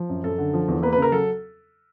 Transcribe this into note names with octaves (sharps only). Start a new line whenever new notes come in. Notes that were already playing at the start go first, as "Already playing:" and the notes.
Already playing: F3
F#2
F#2 A4
D3
F3
E2
A#3 B4
C#3 B4
A#4
F#3 A4